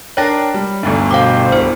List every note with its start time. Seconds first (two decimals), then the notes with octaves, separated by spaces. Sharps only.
0.17 D4 A#4 C#5 G5 A#6
0.54 G3
0.83 G1 D2 G2
1.11 B2 C5 F5 G5 D6
1.52 C2 E4 G4 C5